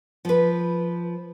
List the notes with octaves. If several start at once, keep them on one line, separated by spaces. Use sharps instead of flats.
F3 B4